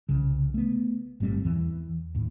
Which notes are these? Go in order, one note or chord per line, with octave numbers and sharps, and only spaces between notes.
C2 C#3
A3 B3
G1 A2 G3 C4
E2 E3
D#2 A2